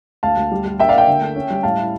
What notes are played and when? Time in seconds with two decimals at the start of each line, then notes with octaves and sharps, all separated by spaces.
0.23 D2 F5 A5
0.37 D2
0.52 G3
0.65 G3
0.79 A#3 E5 G5
0.89 D5 F5
0.94 A#3 E5 G5
1.08 D3
1.21 A3
1.36 C#4
1.50 G3
1.63 A2 F5 A5
1.78 E4